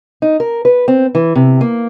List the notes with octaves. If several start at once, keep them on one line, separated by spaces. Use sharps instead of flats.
D#4
A#4
B4
C4
E3
C3
A#3